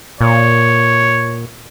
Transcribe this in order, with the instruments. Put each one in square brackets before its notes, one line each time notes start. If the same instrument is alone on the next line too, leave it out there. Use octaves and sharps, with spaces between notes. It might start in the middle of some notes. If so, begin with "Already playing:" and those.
[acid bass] A#2 [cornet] C#5